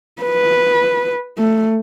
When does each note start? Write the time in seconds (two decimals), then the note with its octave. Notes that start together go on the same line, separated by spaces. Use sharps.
0.22 B4
1.38 A3